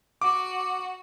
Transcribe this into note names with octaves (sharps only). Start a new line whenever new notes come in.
F#4 D6